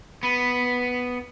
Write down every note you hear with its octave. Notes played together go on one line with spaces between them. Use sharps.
B3